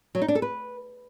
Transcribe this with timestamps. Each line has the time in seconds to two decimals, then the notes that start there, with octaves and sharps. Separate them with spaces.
0.15 F#3
0.22 D#4
0.28 D4
0.35 A4
0.42 B4